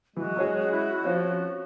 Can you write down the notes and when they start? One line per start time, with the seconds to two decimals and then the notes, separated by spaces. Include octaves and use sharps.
0.17 E3 G#3 F#4
0.37 F#3 C#4 G#4
0.72 E4
1.04 F3 C4 C#4 F4